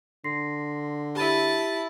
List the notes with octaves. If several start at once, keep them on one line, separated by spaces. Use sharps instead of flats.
D3 C6 A#6 C7
E4 G4 A5 B5 D#7